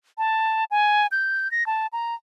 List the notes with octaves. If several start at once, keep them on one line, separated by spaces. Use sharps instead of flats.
A5
G#5
G6
A#6
A5
A#5